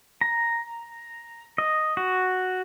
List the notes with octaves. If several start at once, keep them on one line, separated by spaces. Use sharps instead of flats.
A#5
D#5
F#4